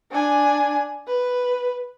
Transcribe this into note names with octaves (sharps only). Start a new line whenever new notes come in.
D4 G#5
B4